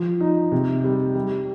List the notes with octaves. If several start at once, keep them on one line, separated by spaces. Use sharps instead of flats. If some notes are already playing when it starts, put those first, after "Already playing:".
Already playing: F3
D#4
C3
G3
G3